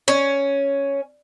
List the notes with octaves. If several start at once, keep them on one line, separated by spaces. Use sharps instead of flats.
C#4